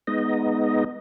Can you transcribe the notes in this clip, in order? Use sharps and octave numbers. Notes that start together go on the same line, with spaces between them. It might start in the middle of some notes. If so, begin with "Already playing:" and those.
G#3 B3 D#4 D#5